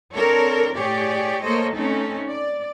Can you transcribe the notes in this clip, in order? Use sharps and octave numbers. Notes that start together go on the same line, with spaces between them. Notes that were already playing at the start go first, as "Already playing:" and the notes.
C4 D4 A4 A#4 C#5
A2 G4 G#4 C#5 D5
A#3 A4 C5 C#5 D#5
A3 C4 C#4 D#4 A4
D5